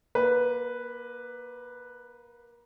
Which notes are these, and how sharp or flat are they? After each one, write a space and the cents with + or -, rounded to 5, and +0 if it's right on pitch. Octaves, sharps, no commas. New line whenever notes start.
A#3 +25 B4 +0